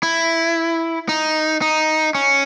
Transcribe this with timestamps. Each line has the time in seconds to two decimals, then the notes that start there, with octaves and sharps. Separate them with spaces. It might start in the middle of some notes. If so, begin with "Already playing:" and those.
0.03 E4
1.09 D#4
1.62 D#4
2.15 C#4